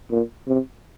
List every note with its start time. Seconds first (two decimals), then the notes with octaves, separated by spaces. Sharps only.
0.10 A#2
0.47 C3